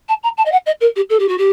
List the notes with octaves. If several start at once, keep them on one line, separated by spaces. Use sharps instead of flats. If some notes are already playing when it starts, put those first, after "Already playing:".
A5
A#5
A5
D#5
F#5
D#5
A#4
G4
A4
G4
F#4
G4